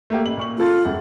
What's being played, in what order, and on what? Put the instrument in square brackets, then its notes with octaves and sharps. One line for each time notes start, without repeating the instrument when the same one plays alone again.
[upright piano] A3 A#3 G4
A1 F#7
A#2 C#6 F#7
[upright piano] C#3 A4 A6 [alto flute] F4
[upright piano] E1 F#2 F#5